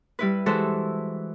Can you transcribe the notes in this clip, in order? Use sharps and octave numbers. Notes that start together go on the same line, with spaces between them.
G3 E4 B4
E3 G#3 F#4 A4 C5 E5